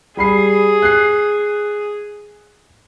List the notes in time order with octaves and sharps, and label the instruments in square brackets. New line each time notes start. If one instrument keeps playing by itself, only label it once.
[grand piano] G3 B5 C7 [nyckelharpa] G#4
[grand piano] F#6 C7